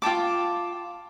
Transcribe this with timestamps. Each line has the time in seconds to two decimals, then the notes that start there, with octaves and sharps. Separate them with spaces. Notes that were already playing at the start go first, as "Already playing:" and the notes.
0.02 F4 G5 A5 D6